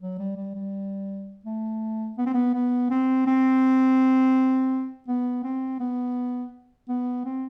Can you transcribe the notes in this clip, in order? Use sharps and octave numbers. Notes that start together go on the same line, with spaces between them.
F#3
G3
G3
G3
A3
B3
C4
B3
B3
C4
C4
B3
C4
B3
B3
C4